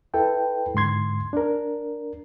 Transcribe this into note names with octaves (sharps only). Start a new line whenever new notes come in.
E4 A4 B4 G5
G#2 D3 C6 G#6
D4 A#4